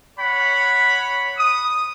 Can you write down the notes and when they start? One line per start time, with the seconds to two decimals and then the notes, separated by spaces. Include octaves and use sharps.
0.19 C#5 F#5 B5
1.38 D#6